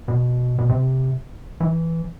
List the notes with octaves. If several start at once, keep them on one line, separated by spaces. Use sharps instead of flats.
B2
B2
C3
E3